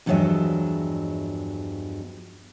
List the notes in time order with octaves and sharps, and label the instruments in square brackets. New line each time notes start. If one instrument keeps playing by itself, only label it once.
[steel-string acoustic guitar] E2 G2 F3 F#3 G#3 E5